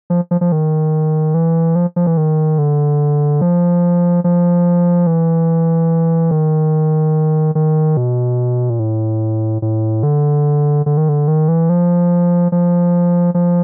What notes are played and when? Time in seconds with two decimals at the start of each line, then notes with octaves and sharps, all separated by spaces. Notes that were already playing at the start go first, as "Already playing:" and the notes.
0.10 F3
0.31 F3
0.41 F3
0.52 D#3
1.34 E3
1.75 F3
1.96 F3
2.06 E3
2.17 D#3
2.58 D3
3.41 F3
4.24 F3
5.07 E3
6.31 D#3
7.55 D#3
7.97 B2
8.70 A#2
8.79 A2
9.62 A2
10.03 D3
10.86 D3
10.97 D#3
11.09 D3
11.28 D#3
11.48 E3
11.69 F3
12.52 F3
13.34 F3